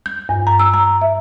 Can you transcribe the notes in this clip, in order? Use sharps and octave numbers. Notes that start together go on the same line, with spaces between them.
G6
G2
A#5
E6
A#5
E5